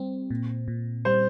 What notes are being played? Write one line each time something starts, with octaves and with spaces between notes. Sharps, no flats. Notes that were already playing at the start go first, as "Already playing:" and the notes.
Already playing: G3 C4
A#2
A#2
G3 C5